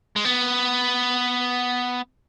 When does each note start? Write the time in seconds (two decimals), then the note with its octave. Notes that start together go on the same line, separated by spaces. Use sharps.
0.16 G#3
0.25 B3